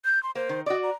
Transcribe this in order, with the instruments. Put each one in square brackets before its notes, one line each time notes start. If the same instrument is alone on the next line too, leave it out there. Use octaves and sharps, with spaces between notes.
[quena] G6
C6
[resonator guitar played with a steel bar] A#3 [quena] C5
[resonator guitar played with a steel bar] D#3
[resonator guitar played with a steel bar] F#4 D5 [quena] D#5
[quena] A#5